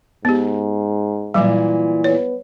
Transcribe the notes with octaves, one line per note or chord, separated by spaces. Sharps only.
G#2 B3 G4
A#2 E3 F#3 G3
B3 C#5